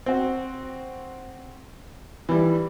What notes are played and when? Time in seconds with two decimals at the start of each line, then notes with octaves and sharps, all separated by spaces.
0.06 C4 F#4
2.29 E3 G3